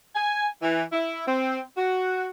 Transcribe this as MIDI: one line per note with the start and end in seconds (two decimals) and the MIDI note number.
0.15 0.47 80
0.62 0.83 52
0.92 1.22 64
1.27 1.60 60
1.77 2.29 66